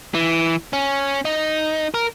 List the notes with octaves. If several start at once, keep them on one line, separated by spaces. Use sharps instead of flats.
E3
C#4
D#4
A#4